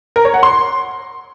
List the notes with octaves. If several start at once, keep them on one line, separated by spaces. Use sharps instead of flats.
A#4
C#5
F#5
C6